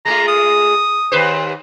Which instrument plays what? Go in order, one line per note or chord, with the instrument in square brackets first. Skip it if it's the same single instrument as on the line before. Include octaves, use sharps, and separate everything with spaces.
[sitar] G#3 A3 F4 [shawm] A#5
[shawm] D#6
[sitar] D#2 B4 C5